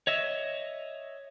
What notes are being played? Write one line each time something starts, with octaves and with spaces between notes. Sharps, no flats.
C#5 D#5 E5